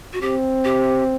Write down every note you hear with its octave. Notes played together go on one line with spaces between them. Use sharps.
F#4
C4 G4
G4